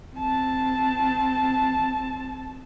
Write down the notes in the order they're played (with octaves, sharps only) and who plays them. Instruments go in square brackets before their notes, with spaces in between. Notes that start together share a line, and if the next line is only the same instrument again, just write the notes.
[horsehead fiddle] C4 A5